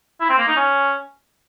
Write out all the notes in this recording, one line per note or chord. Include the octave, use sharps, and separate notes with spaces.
E4
C4
A#3
D#4
C#4